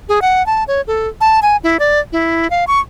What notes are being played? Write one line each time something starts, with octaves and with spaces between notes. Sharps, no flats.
G#4
F#5
A5
C#5
A4
A5
G#5
E4
D5
E4
F5
C#6